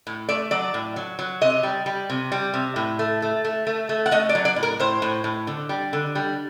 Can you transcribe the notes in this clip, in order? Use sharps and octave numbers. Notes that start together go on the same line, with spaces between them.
A2
A3 D5
F#3 D5
A2
F#3
F#3
C3 D#5
G3
G3
C3
G3
C3
A2
A3
A3
A3
A3
A3
F#5
A3 D#5
D5
F#3
D5
A2
A#4
A2 C5
A2
A2
D3
G3
D3
G3